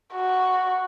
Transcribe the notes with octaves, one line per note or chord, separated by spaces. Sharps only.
F#4